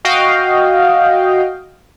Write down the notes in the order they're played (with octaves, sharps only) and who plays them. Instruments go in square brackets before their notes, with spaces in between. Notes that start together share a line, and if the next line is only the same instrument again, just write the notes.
[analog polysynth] F#4 D#5 F5 G5